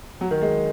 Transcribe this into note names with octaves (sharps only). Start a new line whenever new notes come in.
F#3
D#3
G#3